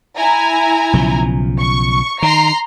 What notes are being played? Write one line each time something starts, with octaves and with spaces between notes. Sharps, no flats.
E4 G#5 A#5
B1 C#3 F3
C#6
D#3 A#5 C6 C7